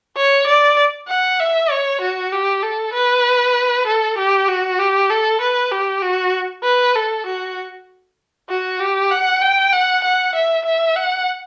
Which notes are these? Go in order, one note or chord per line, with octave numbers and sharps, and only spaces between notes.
C#5
D5
F#5
E5
C#5
F#4
G4
A4
B4
A4
G4
F#4
G4
A4
B4
G4
F#4
B4
A4
F#4
F#4
G4
F#5
G5
F#5
F#5
E5
E5
F#5